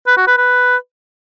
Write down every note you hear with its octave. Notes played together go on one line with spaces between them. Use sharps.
B4
F#4
B4
B4